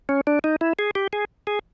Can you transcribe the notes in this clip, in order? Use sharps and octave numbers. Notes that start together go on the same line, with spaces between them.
C#4
D4
D#4
E4
G#4
G4
G#4
G#4